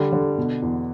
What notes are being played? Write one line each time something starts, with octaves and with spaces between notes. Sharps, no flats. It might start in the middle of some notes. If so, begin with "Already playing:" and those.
Already playing: D3 G3
D3
B2
E2